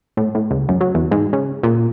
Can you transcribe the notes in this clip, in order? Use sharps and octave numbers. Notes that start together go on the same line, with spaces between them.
A2
A2
C#2
F#2
F#3
E2
G#2
C#3
A#2